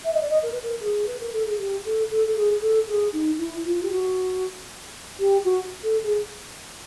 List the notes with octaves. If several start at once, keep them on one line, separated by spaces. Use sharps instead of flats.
E5
D#5
D5
D#5
A#4
B4
A#4
G#4
B4
A#4
A4
G#4
G4
A4
A4
A4
G#4
A4
G#4
D#4
E4
F4
G4
F#4
G4
F#4
A4
G#4